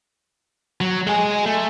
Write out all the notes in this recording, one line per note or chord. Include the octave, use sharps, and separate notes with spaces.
F#3
G#3 G#4
A3